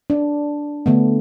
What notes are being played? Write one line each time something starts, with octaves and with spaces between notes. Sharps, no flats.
D4
D3 A3 B3